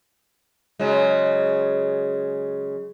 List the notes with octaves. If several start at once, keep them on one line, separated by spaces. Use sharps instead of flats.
C#3 F#3 G#3